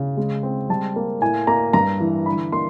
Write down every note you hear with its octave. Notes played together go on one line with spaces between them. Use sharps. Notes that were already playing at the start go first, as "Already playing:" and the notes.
Already playing: C#3
G#3
C4
G3 A5
A#3
A2 G#5
A#3 A#5
G2 A#5
E3
D3 B5
A#3 C6